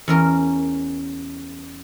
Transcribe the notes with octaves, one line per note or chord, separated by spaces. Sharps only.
E2 C#4 A#4